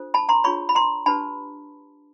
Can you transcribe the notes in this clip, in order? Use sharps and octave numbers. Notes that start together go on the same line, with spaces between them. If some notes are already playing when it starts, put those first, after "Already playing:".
Already playing: D4 F4 A4 C5
A5 B5
A#5 C6
D4 F4 G#4 C#5 B5 C#6
B5
A#5 C6
D4 G4 B4 A5 B5